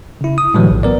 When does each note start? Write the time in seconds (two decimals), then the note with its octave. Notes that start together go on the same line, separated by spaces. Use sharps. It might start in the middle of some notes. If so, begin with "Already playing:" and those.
0.21 C#3 E4
0.38 D#6
0.54 A2 D3 E3 F#3 G3
0.70 A#1
0.83 B3 A#4 D5